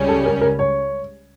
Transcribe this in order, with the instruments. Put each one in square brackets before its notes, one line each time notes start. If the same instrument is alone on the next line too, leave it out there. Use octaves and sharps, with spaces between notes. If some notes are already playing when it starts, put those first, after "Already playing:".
Already playing: [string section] C#2 C#3 G3 C#4
[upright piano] A4
A#4
A#4
C#5